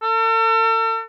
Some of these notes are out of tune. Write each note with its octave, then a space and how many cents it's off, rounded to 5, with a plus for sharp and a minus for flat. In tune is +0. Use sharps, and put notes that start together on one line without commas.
A4 +40